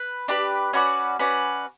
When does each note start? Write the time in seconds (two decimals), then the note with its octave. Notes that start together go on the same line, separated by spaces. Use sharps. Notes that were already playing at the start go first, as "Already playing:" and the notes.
Already playing: B4
0.28 D4 G4 B4
0.73 C#4 F#4 B4 D5
1.19 C#4 F#4 B4 D5